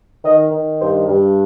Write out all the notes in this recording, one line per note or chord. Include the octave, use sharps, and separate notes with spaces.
D#3 D#5
D#3
G2 C5
G2